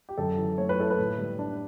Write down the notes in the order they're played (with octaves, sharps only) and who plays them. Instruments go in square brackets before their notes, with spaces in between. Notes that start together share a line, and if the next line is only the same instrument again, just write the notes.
[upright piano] G4
[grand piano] F#2 [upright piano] A4
[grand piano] E3
[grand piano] A3 [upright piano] C#5
[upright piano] B4
[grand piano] E4 [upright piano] A4
[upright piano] B4
[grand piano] A2
G3
D4